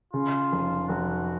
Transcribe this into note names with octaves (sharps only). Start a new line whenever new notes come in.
C#3 F4
F1
F1 F#4